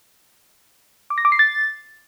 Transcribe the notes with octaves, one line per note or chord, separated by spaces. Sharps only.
D6
A#6
D6
C7
A6